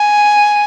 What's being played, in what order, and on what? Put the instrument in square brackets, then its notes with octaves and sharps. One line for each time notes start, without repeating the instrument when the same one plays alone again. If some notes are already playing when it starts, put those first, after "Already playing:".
Already playing: [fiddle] G#5